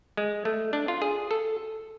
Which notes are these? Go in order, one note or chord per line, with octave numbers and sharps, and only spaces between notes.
G#3
A3
D4
F4
G#4
A4